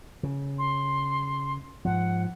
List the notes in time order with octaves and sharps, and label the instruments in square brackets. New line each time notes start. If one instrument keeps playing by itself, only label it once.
[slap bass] C#3
[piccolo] C6
[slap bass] G#2 F3 [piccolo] F#5